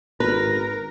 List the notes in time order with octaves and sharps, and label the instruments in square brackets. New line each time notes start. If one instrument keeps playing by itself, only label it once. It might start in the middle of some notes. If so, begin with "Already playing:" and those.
[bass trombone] G#1 [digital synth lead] A#4 [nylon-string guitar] B4 [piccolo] A#6